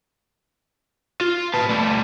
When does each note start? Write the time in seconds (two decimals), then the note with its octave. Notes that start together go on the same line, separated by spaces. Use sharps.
1.21 F4
1.54 B4 A5
1.69 G3 A3